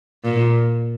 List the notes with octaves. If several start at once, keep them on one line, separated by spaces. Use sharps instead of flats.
A#2